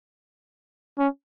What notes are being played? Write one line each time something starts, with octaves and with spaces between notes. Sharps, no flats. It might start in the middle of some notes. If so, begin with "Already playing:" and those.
C#4